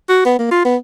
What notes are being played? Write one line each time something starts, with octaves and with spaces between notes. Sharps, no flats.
F#4
B3
A#3
F4
B3